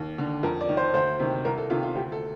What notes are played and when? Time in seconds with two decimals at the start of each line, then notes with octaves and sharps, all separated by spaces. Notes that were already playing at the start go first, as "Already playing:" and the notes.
Already playing: D#2
0.18 D3
0.43 F2 A#4
0.61 D5
0.69 D#3
0.77 C5
0.94 D2 C5
1.19 C3 D#3
1.45 C2 A#4
1.58 A4
1.70 C3 D#3 F4
1.83 F4
1.95 D2 G4
2.12 A4